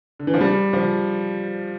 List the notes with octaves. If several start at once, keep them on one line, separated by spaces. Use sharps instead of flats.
D3
E3
F3
G3
F3